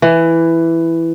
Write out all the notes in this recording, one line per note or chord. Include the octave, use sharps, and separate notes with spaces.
E3